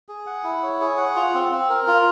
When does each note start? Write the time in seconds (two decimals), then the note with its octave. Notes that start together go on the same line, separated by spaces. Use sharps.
0.09 G#4
0.26 F#5
0.44 E4
0.63 C#5
0.81 G#4
0.97 F#5
1.16 F4
1.34 C4
1.51 C4
1.69 A#4
1.87 F4